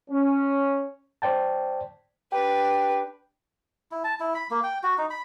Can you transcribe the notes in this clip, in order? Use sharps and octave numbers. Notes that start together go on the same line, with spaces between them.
C#4
C5 D5 G5 A5
D4 G4 B4
E4
A5
E4
B5
A#3
G5
F#4
D#4
B5